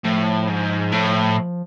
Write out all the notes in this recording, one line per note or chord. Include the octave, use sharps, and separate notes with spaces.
A2 F3
G#2
A2